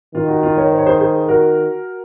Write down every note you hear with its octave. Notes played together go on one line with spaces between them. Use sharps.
D#3 F4
F#4
F4
A#4 C#5
C5
C#5
G#4 C5
G#4 C5
F#4 A#4